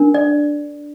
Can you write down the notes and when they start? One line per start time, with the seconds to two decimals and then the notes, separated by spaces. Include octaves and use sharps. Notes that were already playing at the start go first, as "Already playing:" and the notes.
Already playing: D4 A#4
0.14 D5